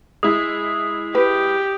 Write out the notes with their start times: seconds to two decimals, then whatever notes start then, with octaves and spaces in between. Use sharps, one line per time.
0.23 G#3 E4 D#6
1.15 G4 B4